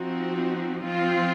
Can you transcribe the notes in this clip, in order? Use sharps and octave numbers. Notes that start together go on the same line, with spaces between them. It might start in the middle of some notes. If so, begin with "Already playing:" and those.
Already playing: F3 C4 D#4 F#4
F3 C4 F4